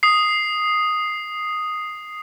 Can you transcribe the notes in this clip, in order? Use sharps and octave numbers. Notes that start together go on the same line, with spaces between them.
D#6 C7